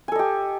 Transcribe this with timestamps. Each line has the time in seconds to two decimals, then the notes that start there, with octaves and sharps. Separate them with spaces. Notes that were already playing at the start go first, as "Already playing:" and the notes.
0.08 G#5
0.12 A4
0.15 D#5
0.19 G4